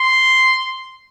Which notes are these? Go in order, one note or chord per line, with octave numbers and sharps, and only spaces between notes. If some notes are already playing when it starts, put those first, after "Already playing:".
Already playing: C6